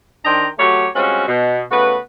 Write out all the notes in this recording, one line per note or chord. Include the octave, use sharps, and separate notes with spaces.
D#3 D4 C5 D#5 G5 A#5
F#3 A3 F#4 G4 C#5
G3 G#3 C4 C#4 F4 F#4
B2
C#3 A3 B3 F#4 B4